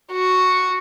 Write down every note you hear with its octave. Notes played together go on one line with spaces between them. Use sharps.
F#4